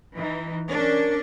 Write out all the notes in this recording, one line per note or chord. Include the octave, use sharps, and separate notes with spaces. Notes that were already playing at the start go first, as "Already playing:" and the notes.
E3 D#4
C#4 D4 A#4